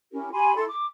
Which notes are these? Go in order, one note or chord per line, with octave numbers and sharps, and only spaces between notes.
C#4 E4 G4 A#4
G4 G#5 B5 C6
E4 A4 C6
D6